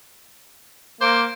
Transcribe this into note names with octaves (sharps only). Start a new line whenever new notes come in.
A#3 C5 D6